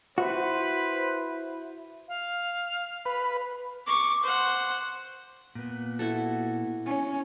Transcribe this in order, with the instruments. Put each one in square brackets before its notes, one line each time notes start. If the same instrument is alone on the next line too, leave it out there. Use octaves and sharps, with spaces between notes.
[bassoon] E4 [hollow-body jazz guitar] F#4 [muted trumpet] B4 [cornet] C5
[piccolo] F5
[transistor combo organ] B4
[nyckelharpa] C#6 D6
C5 F#5
[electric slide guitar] A#2 B3
[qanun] E4 F#4 A4
[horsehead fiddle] C#4